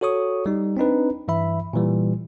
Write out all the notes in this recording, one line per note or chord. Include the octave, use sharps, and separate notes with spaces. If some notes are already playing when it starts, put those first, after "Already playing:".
F#4 A4 C#5 C#6 D#6
G3 D#4
C4 D4 D#4 B4
G2 E3 E5 B5
A#2 E3 G3